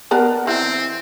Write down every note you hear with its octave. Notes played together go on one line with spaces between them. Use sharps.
B3 D4 A#4
E3 C4